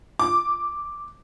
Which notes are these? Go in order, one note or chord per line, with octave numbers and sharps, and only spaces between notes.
D6